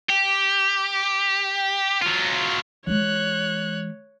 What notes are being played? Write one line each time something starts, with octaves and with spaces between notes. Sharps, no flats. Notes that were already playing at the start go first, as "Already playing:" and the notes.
G4
F#3 F4
E3 G#3 C#5 F#6